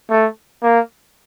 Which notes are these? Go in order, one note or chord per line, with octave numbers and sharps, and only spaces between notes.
A3
A#3